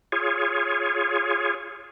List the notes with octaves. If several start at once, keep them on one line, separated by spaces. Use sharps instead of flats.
F4 G#4 C#5